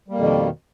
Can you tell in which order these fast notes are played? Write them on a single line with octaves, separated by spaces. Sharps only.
G3 A#3 F2 B2 D#3